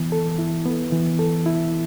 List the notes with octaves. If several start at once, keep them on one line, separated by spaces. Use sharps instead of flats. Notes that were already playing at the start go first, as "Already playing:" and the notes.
Already playing: E3 B3
A4
E4
B3
E3
A4
E4